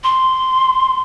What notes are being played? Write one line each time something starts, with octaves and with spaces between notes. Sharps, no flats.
C6